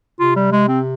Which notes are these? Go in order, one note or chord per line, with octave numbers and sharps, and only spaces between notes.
C3 F4
G3
G#3
C4